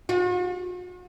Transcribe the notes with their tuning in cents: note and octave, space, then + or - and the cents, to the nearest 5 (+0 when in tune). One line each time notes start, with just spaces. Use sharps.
F#4 -45